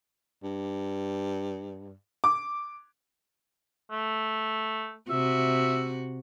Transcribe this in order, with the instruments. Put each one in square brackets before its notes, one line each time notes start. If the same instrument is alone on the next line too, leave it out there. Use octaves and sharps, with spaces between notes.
[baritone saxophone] G2
[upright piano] D6
[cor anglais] A3
[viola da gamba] C3 F#4 [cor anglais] E5